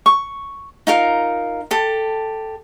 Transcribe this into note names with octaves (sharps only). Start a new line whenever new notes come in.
C#6
D#4 F4 A#4
G4 A4